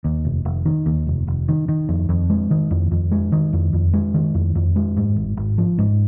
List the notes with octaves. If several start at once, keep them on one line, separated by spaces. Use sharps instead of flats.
D#2
F1
F1
D#3
D#2
F1
F1
D#3
D#3
F2
F2
G#3
D#3
F2
F2
G#3
D#3
F2
F2
G#3
D#3
F2
F2
G#3
G#2
G#1
G#1
F3
G#2